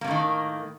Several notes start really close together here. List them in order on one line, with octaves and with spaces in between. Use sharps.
A#3 C3 A2 D#3